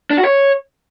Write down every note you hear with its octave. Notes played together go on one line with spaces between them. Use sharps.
D4
F#4
C#5